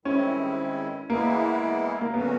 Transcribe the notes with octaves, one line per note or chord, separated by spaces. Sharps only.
G2 D#3 G#3 C4 C#4 E4
E3 G#3 A#3 B3 E4
A#3
D3 F#3 A3 B3 C#4 F#4